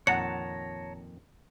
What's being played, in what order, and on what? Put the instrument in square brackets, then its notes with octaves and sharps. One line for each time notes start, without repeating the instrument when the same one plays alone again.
[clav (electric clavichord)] F2 A#2 D#3 [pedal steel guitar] C#5 A5 A#5 [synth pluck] F#5 [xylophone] C#7